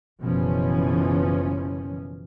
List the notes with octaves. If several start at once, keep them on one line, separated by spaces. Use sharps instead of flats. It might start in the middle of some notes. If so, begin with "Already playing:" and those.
F#1 B2 E3 F3 C#4